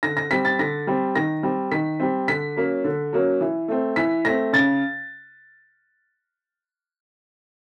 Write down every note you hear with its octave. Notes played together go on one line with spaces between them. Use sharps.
D3 A#6
A#6
G3 C4 B6
A6
D3 A#6
G3 C4
D#3 A#6
G3 C4
D#3 B6
G3 C4
D3 B6
F#3 A#3 C#4
D3
F#3 A#3 C#4
E3
A3 C4
E3 B6
A3 C4 A#6
C#3 A6